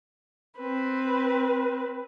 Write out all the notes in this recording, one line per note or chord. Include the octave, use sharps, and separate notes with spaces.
C4 B4